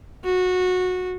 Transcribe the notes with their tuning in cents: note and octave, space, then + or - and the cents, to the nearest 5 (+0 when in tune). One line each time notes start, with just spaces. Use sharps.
F#4 -15